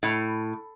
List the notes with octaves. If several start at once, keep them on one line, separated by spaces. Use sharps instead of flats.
A2